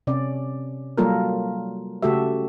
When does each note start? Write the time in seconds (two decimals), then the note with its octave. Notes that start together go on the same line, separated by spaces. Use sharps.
0.07 C3 C#4 D5
0.98 F#3 G3 A#3 F4 A4 A#4
2.03 C#3 A3 F#4 G4 A4 E5